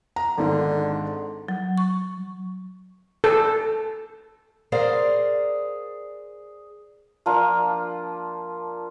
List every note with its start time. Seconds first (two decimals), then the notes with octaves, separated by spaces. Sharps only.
0.16 A#5
0.38 G#1 G#2 D3
1.48 F#3
1.78 C#6
3.24 A4
4.72 G#4 A#4 C5 D5 F5
7.26 F3 A#3 D4 F4